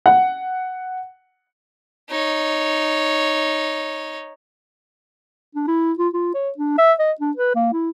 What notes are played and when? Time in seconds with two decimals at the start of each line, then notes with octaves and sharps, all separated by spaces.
0.06 F#5
2.10 D#4 C#5
5.55 D4
5.67 E4
5.98 F4
6.14 F4
6.34 C#5
6.58 D4
6.78 E5
6.99 D#5
7.21 D4
7.37 B4
7.55 A#3
7.73 E4